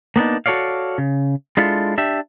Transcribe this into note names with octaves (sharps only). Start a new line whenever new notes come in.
A#3 B3 D4 D#4
F#4 A4 C#5 D5 F5
C#3
G#3 D4 E4 F4 A4
D4 G4 E5